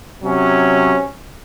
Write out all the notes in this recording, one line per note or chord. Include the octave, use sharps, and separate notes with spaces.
C3 F#3 C#4